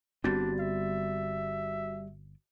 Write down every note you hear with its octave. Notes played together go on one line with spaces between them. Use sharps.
G1 G3 B3 C4 D4 F#4 A6
E5